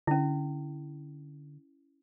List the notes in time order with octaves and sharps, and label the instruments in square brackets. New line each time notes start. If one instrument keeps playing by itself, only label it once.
[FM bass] D3 [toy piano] C#4 E4